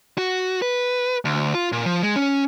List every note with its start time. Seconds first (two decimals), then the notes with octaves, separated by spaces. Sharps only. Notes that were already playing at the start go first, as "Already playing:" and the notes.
0.18 F#4
0.62 B4
1.25 D2
1.54 F4
1.72 A#2
1.85 F3
2.03 G#3
2.16 C#4